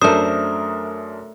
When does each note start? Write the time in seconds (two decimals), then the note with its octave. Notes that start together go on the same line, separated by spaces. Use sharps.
0.02 F#2 A3 D4 A#4 C5 D#6